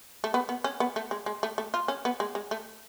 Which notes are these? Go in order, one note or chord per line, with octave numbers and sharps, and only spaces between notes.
A3
B3
B3
C#4
B3
A3
G#3
G#3
A3
A3
F4
C#4
B3
G#3
G#3
A3